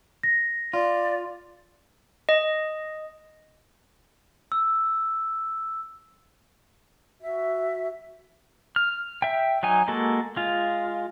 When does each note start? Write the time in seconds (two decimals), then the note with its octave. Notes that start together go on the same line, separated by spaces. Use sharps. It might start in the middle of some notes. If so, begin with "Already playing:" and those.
0.23 A#6
0.73 F4 D5
2.29 D#5
4.52 E6
7.22 F#4 E5
8.76 F6
9.22 E5 G5
9.63 F#3 D#4 G#5
9.88 G#3 A#3 F#4 A4
10.36 G#3 F4